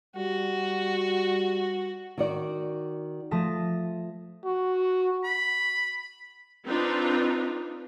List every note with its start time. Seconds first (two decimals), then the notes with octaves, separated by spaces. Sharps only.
0.16 G3 F#4
2.18 D#3 F#4 D5
3.31 F3 A3 A5 D#6 A#6
4.45 F#4
5.24 B5
6.66 C4 D4 D#4 F4 B4